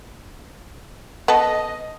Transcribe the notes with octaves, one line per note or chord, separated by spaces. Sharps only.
B3 A4 D#5